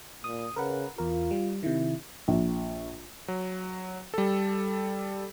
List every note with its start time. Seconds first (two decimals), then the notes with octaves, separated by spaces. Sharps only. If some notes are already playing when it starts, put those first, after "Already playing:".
0.24 A#2 D#6
0.56 C#3 A#4 B4 F#5
0.98 E2 F4 A#4
1.31 G3
1.63 C3 D#3 E4
2.28 A#1
3.28 F#3
4.14 G3 A4